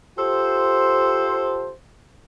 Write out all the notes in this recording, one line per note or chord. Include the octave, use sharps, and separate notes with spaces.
F4 G4 A4 C5